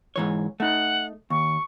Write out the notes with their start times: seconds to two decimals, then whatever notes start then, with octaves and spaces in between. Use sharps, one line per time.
0.16 G#2 E3 C#5
0.60 A3 D#4 F#5
1.30 D#2 C#6